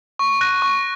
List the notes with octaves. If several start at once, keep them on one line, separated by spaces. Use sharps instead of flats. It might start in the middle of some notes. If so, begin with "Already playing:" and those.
C#6
F#6 A#6 D#7
C#6